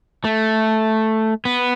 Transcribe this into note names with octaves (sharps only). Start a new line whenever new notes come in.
A3
B3